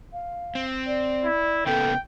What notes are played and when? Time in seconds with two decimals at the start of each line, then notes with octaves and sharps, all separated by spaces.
0.13 F5
0.55 C4
0.87 D5
1.25 E4
1.67 C#3 A#3 B3 A4 G5